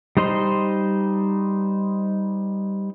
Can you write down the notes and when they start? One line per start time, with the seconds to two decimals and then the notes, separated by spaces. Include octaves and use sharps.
0.17 G3 D#4 C5 D#5 C6